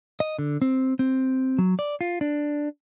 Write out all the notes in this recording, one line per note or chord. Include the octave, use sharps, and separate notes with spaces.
D#5
D3
C4
C4
F#3
D5
F4
D4